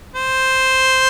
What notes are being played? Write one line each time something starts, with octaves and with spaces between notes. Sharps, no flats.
C5